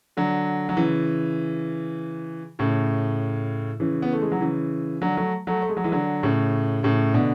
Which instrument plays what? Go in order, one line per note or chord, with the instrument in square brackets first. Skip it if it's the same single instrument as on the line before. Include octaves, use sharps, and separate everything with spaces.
[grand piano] D3 F#3
F#3
C#3 E3
A2 C#3
C#3 E3
B3
A3
G#3
F#3
C#3 E3
D3 F#3
F#3 A3
F#3 A3
A3
G#3
F#3
E3 G#3
D3 F#3
A2 C#3
A2 C#3
B2 D3